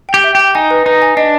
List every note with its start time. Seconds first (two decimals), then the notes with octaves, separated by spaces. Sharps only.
0.09 G5
0.14 G4
0.24 E5
0.35 G4 G5
0.55 D#4 G#5
0.71 B4
0.86 D#4 B4
1.02 G#5
1.17 D4 D#5